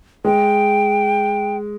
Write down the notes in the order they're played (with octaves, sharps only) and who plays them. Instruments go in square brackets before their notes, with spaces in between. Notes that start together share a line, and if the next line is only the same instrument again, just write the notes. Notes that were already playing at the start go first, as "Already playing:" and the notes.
[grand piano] G#3 [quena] G5